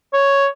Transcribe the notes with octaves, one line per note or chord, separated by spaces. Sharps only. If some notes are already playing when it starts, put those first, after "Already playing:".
C#5